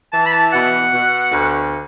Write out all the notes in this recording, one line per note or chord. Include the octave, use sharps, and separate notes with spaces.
E3 A5
B5
A5
B2 F#5
B2
D2